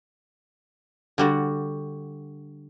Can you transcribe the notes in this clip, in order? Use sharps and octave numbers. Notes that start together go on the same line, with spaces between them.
D3 G3 F#4